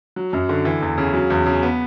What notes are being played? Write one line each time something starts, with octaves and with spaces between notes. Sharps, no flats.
F#3
F#2
D3
E3
E2
C#3
F#3
E2
C#3
B3